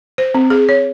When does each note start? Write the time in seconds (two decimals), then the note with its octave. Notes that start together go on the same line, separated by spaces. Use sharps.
0.18 C5
0.34 C4
0.50 G#4
0.69 C#5